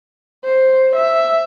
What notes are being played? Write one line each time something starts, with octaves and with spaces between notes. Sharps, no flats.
C5
E5